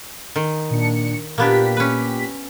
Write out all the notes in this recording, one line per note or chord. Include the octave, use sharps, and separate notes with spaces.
D#3
A#2 D4 C#7
A#2 A#3 B3 D4 G4 B6
C#4 B4